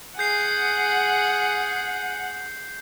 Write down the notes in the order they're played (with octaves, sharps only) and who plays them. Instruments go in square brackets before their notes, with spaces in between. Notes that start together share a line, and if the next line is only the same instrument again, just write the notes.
[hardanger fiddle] G#4 [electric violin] F#5 [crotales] G6 C7